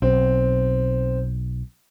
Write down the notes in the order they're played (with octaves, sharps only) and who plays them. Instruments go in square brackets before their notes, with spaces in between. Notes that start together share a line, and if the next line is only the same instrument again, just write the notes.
[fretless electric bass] B1 [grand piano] C4